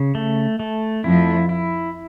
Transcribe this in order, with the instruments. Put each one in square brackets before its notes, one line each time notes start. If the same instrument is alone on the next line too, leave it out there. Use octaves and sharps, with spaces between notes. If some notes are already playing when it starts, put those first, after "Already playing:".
Already playing: [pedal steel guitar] C#3
A3
A3
[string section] F2 F3 [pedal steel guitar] E4
[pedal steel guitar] E4